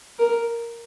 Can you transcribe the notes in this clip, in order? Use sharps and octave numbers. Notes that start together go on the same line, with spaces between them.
A#4